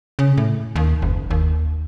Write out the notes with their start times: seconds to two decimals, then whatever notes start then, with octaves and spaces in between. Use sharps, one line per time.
0.19 C#3
0.37 A2
0.76 D#2
1.02 F#1
1.31 D#2